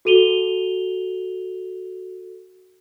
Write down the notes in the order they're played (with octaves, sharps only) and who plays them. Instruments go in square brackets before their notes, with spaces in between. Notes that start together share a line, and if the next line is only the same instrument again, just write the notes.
[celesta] F#4 A4 D#7 F7 G7